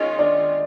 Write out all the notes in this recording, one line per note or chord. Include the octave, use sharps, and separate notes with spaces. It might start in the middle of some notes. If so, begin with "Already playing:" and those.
Already playing: D#3 G#3 C#4 D#4 F4
D4